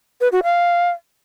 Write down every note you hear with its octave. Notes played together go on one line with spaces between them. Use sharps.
B4
F#4
F5